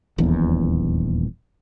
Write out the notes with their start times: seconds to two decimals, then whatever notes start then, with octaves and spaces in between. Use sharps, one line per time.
0.18 D#1 A#1 E2